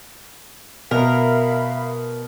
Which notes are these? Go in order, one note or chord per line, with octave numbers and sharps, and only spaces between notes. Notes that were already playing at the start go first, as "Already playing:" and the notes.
B2 A#4 E5 F5 B5